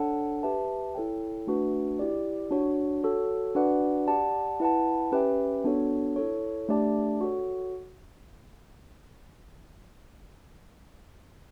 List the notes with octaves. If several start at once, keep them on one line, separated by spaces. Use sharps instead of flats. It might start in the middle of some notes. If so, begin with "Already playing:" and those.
Already playing: D4 A4 C#5 F#5 A5
G4 B4 E5 A5
E4 A4 C#5 G5
A3 D4 F#4 B4
E4 G4 D5
D4 F#4 C#5
F#4 A4 C#5
D4 F#4 B4 D5 F#5
G4 D5 F#5 A5
E4 B4 F#5 A5
C#4 G4 B4 E5 G5
B3 D4 F#4 A4 C#5
E4 A4 C#5
A3 D4 G4 D5 A5
F#4 A4 C#5